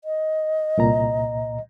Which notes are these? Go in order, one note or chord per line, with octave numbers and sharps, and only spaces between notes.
D#5
C2 A#2 A#5